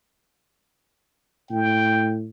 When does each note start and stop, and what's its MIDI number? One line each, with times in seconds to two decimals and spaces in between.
1.51 2.30 45
1.51 2.16 79